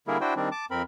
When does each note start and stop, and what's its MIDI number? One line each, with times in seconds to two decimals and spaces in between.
0.08 0.18 50
0.08 0.18 55
0.08 0.18 58
0.08 0.18 64
0.08 0.18 68
0.08 0.18 70
0.21 0.34 62
0.21 0.34 64
0.21 0.34 66
0.21 0.34 72
0.21 0.34 79
0.36 0.49 51
0.36 0.49 55
0.36 0.49 60
0.36 0.49 62
0.52 0.65 81
0.52 0.65 86
0.71 0.82 41
0.71 0.82 60
0.71 0.82 70
0.71 0.82 83